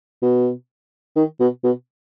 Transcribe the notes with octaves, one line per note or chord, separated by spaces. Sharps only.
B2
D#3
B2
B2